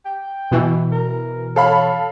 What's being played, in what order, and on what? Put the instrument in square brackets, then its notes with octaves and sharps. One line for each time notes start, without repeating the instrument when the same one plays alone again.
[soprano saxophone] G5
[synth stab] B2 E3
[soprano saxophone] A#4
[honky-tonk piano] A4 F5 B5 [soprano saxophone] C#5